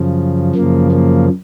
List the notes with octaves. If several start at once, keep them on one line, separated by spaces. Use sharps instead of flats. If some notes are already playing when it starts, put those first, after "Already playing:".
Already playing: F#2 C#3 F3
F#2 C#3 F3 A#3
A#3